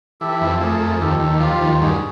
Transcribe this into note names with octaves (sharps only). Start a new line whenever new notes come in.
E3 G4 A4
F2
A3 G#4 A#4
F2
D#2 G4 A4
D#2
F3 F4 G4
D#2
G2 F#4 G#4